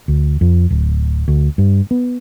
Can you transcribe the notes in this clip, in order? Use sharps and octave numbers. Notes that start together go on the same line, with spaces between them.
D2
F2
D1
D2
G2
B3